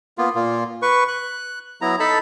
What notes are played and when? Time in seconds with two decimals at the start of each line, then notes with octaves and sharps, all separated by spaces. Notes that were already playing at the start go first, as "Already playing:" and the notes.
0.18 A#3 B3 F4
0.35 A#2 A#3 F4
0.82 B4 C#6
1.08 F#6
1.81 F#3 B3 E4 A#5
2.00 D#4 A4 A5 B5